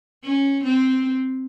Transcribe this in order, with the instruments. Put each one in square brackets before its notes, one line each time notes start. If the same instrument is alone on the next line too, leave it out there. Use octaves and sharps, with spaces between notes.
[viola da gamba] C#4
C4